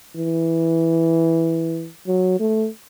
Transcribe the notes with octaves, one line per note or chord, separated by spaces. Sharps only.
E3
F#3
A3